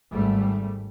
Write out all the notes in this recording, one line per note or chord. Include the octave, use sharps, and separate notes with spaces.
G#1 G3 A3